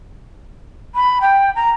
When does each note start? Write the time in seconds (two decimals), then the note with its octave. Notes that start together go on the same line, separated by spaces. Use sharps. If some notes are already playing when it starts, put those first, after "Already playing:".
0.95 B5
1.21 G5
1.56 A#5